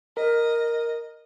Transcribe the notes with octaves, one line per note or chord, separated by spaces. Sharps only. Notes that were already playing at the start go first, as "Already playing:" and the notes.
A#4 D#5